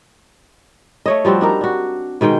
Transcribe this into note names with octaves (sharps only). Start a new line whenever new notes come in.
A3 C#5 D#5
F3 G3 C4 F#4
D4 D#4 A#4
D4 F#4
B2 D#3 G#3 G5